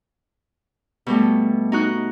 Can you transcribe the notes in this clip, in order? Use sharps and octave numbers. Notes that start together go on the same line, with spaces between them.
B2 G3 A3
D#4 F#4 F#6